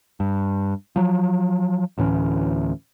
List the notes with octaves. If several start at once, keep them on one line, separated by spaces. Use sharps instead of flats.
G2
F3 F#3
D2 A2 E3 C#4